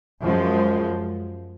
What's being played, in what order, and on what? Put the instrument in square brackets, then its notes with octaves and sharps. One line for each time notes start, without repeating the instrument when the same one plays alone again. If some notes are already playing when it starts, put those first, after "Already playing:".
[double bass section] F#2 F3 G#3